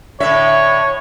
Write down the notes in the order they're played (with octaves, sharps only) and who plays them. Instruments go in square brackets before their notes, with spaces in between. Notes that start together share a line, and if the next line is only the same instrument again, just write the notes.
[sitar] A2 D3 E5 [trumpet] C#5